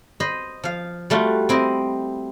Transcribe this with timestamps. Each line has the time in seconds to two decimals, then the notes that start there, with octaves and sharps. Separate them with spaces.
0.20 C5 D#5 B5
0.64 F3 F5
1.10 G3 A3 F4 F#4
1.49 C4 E4 C5 D#5